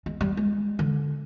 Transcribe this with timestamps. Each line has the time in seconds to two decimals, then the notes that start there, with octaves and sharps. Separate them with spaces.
0.06 G#3
0.21 G3
0.37 G#3
0.79 D3